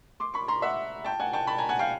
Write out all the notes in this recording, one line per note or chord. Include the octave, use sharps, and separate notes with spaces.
C6 D6
B5 C#6
A#5 C6
E5 F#5
G5 A5
F#5 G#5
G5 A5
A5 B5
G#5 A#5
F#5 G#5
F5 G5